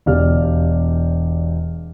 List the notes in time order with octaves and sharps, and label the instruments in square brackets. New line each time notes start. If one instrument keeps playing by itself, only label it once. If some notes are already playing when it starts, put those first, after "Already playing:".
[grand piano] E1 B2 G4 D5 F5 F6